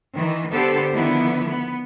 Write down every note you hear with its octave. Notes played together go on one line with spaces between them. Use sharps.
D#3 E3
D3 B3 G4 A4 C5
D3 D#3 F3 B3 D4 E4
B3